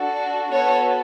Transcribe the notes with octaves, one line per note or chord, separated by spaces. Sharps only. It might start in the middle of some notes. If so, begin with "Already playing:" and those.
Already playing: D4 F#4 A4
B3 F#4 A4 C#5